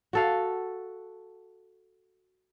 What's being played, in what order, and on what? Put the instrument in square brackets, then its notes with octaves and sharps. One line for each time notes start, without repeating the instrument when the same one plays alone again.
[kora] F#4 A4 F5